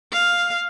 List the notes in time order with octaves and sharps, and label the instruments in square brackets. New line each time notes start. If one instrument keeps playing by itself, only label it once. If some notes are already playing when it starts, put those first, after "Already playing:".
[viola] F5